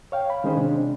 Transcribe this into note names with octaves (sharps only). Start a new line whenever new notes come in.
C#5 F5 G5
B5
D#3 G#3 C#4 D#4 G#4 C5
C3 D4